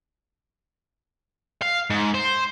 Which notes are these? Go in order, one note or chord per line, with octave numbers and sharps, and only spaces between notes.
F5
G#2
C5